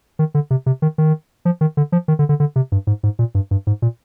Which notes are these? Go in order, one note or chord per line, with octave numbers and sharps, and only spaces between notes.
D#3
D3
C3
C3
D#3
D#3
F3
D#3
D3
F3
D#3
D3
D3
D3
C3
G2
G#2
G#2
A#2
G2
G2
G#2
A#2